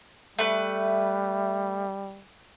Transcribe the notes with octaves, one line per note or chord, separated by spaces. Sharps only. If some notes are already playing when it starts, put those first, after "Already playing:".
G3 A3 B4